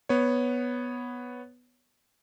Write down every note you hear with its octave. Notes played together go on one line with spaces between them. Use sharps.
B3 C#5